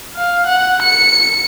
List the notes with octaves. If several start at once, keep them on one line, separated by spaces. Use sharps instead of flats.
F5
F#5
C#7